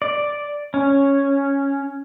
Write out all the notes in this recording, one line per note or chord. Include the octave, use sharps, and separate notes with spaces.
D5
C#4